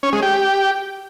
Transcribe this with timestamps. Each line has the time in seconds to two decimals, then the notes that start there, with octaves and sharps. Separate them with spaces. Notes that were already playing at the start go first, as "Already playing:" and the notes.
0.03 C#4
0.13 G#3
0.22 G4